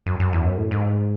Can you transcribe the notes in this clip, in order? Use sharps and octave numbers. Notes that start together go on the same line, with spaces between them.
F#2
F#2
E2
F#2
A2
G#2